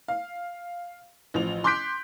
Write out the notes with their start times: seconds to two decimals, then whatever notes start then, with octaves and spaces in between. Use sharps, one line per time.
0.08 F5
1.34 A1 F3 F7
1.64 C6 D6 F#6 G6 B6 D7